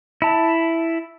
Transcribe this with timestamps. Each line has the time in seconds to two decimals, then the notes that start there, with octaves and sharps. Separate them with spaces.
0.22 E4 A5